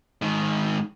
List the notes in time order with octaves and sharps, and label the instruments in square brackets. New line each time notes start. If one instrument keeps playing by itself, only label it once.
[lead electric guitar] G#2 D#3